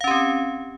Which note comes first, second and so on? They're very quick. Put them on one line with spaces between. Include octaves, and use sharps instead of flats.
F5 C#4 G4 C4